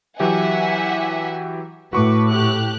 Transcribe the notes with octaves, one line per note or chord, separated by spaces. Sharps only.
E3 F#3 G4 E5 F#5 G#5
A2 F#4 B4 C#6 D6
G4 F#6